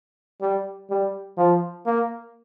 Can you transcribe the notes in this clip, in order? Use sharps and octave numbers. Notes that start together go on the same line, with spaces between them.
G3
G3
F3
A#3